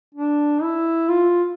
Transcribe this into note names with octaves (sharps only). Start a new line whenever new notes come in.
D4
E4
F4